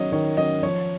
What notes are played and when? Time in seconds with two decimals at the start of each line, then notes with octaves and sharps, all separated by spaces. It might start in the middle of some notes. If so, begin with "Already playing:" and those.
Already playing: D#3 F#3 C#4 C#5 D#5
0.12 D#3 C#5
0.37 F#3 C#4 D#5
0.63 F3 C#5